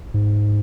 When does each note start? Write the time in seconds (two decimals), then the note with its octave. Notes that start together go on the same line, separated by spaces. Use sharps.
0.14 G#2